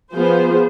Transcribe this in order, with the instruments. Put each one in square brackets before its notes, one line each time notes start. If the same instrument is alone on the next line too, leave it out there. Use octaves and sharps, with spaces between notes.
[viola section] F3 B3 F4 G#4 C5